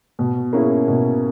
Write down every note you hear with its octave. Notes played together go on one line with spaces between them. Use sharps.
B2
A#3 C#4 E4 G#4
B2